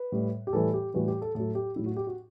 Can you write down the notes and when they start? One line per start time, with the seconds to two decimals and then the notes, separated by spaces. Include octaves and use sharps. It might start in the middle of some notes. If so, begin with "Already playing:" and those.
Already playing: B4
0.12 A2 G3
0.47 G4
0.53 A2 E3 G3 A4
0.74 G4
0.94 A2 E3 G3 F#4
1.08 G4
1.22 A4
1.35 A2 F#3 A4
1.55 G4
1.76 F#3 E4
1.79 A2
1.86 F#4
1.96 G4
2.07 F#4